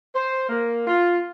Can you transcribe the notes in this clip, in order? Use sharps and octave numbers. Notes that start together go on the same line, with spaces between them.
C5
A#3
F4